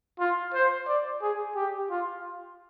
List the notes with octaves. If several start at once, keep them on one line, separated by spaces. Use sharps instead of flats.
F4
C5
D5
G#4
G4
F4